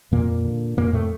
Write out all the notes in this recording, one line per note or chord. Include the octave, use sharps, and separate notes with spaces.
F2 A#2 A#3
D3
F2 A#2 A#3
A2 A3